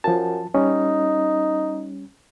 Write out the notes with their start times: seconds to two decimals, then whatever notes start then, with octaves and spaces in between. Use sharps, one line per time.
0.04 F#2 F3 A5
0.55 G3 C#4 D#4